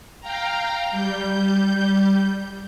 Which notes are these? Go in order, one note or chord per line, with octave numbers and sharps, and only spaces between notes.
F5 G5 A#5
G3 G6